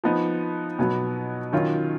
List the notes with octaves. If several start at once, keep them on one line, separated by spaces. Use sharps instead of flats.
F3 B3 D#4
B2 F#3 B3
D#3 F#3 C#4 F4